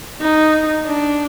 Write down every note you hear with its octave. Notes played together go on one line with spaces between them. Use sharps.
D#4
D4